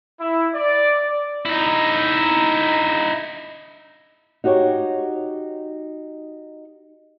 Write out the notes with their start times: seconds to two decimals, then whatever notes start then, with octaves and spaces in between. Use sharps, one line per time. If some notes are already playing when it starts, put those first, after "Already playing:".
0.20 E4
0.54 D5
1.45 D#4 E4
4.44 D#4 F#4 G4 C#5